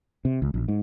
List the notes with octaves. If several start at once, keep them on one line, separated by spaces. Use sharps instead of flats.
C3
C#2
A#1
G#2